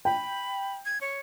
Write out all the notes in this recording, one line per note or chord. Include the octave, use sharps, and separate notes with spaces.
G5 B5
G#6
C#5